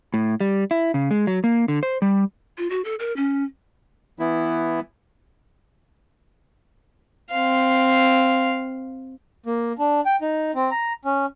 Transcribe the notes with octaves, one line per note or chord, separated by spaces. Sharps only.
A2
G3
E4
C#3
G#3
F#3
A#3
D3
C5
G3
F4
F#4
A4
A#4
C#4
E3 B3 E4
C4 F5
A#3
D4
G5
D#4
C4
A#5
C#4